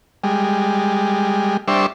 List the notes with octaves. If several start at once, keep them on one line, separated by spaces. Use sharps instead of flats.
G3 G#3
G3 D4 C5 E5 C#6